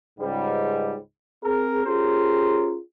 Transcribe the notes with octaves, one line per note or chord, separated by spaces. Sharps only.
C#2 G#2 G3
C4 G#4 A#4
C#4 F4 G4 G#4 A#4 C5